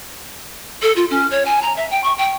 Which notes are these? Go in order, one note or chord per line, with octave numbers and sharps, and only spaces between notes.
A4
F4
C#4
C#5
G#5
A#5
E5
G5
C#6
G5